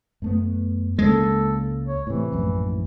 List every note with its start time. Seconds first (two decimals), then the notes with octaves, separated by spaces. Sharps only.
0.22 F#2 A3 B3
0.99 C#2 G#3 A#3 C#4 A4
1.88 C#5
2.07 A2 C3 E3
2.33 A#1 F#2 A2